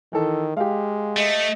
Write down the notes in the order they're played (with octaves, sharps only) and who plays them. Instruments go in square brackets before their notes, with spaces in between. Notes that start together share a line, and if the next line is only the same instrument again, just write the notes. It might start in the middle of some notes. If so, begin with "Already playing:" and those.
[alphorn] D#3 [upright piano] E3 A4
[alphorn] G#3 [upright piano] G4 F5
[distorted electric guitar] A3 [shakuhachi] D#5